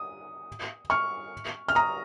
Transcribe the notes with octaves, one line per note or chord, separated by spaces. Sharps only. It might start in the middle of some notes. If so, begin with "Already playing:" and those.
Already playing: D#6
C#6 F6
F6
A#5 D#6